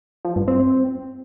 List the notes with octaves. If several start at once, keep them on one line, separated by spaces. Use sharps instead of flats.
F3
G2
C4